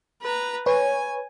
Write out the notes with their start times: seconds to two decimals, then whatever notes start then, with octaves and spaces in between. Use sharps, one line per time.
0.21 B4 A#5
0.66 B4 C#5 G#5